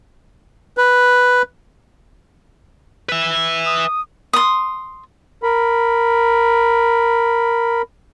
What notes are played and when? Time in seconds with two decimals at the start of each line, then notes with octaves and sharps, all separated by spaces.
0.78 B4
3.09 B4 E5
3.66 D#6
4.33 C6 D#6
5.43 A#4 B5